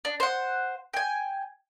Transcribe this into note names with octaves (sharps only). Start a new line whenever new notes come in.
D4
C5 F#5
G5 G#5